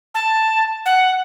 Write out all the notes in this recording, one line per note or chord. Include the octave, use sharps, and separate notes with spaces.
A5
F#5